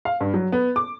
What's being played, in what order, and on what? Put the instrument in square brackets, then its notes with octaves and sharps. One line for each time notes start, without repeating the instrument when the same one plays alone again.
[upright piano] F5
G2
F#3
B3
D6